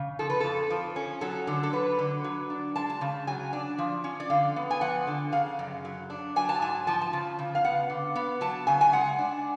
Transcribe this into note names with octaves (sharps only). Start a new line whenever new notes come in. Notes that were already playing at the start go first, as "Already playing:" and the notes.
Already playing: C#3
F3 A4
B4
F2 A4
F3
C#4
F#3 A4
D3
A4
F#3 B4
D3
F#3
D4
G#3 A5
A5
C#3
F#3 G#5
D4
F3
C#4
D5
D3 F5
B3
G#5
F3 F#5
D3
C#3 F5
F#2
F#3
D4
F#3 G#5
A5
G#2 G#5
F3 A5
A5
C#3
C#3
F5
B3 F#5
D3
B3
F#3 A5
C#3 G#5
G#5
G#3 F#5
D4